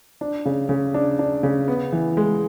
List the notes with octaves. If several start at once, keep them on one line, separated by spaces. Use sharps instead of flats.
D4
C#3
C#3
D4
D4
C#3
B3
E3
G#3